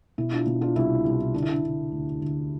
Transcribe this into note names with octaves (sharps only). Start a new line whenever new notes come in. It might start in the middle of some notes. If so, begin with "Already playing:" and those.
B2 E4
D4 F4
B2
D4 F4
C2 E4
C2
D3 D4
E4
D4
D3
D2
D2